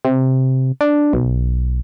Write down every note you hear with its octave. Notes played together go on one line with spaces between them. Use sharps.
C3
D4
B1